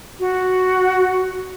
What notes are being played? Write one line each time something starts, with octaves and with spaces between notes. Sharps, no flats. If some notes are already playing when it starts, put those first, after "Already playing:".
F#4